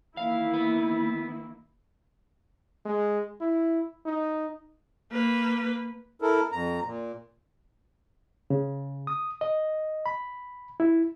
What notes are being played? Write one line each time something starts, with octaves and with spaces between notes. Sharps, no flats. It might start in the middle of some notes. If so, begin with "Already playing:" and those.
D#3 E3 A#3 E4 F5
B3
G#3
E4
D#4
A#3 B4
E4 A4 A#4
F2 A#5
A#2
C#3
D#6
D#5
B5
E4